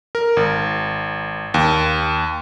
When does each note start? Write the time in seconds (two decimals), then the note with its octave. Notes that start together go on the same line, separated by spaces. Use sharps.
0.15 A#4
0.37 G#1
1.54 D#2